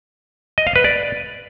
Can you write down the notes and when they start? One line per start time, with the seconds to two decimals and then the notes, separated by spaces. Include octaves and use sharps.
0.58 D#5
0.67 F5
0.76 B4
0.84 D5